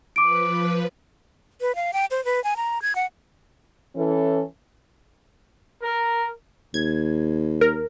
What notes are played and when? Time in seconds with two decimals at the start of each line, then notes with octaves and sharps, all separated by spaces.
0.16 F3 B4 D6 D7
1.61 B4
1.75 F5
1.93 G5
2.11 C5
2.25 B4
2.44 G#5
2.56 A#5
2.82 G#6
2.95 F#5
3.96 E3 C#4 A4
5.83 A#4
6.74 D#2 G#6
7.61 A#4